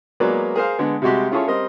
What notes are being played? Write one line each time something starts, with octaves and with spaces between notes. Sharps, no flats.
F#3 G#3 A#3 B3 B4 D5
G#4 A#4 C5 F5
D3 G#3 B3
C3 G3 G#3 F#4 G4
C#4 E4 F4 G#4 A4 C#5
G3 C4 A#4 C5 D#5